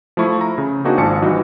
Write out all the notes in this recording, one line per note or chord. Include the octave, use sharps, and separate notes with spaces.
F3 A3 E4 C#6
A#5
C#3
A#3 C4 D4 D#4 F#4 G#4
G#1 F3 G#5 A5 C#7
G2 E3 D#4 F#4